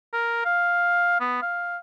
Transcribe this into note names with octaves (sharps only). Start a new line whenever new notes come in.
A#4
F5
B3
F5